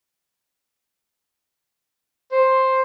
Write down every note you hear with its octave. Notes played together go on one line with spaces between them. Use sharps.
C5